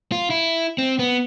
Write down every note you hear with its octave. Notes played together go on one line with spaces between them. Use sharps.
F4
E4
C4
B3